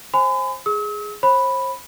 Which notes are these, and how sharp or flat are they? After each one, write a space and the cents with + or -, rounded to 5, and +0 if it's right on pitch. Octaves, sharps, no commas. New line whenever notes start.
C5 +20 G#5 -5 B5 +45
G#4 +0 E6 -45
C5 +40 B5 +0